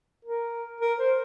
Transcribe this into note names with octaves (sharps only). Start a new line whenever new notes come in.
A#4
A#4
C5